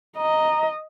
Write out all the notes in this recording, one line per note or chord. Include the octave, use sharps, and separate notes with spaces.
D#5 A#5